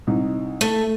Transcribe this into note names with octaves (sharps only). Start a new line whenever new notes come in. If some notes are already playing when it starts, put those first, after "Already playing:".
C2 D#4
A3